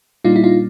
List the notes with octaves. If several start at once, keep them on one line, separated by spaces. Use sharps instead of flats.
A#2 G3 A#3 D4 D#4 F4
E4
D#4 F4